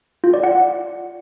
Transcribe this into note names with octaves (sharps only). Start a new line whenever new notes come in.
F4
D5
F#5